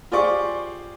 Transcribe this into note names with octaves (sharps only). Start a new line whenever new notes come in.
F4 G4 G#4 C5 D5 C#6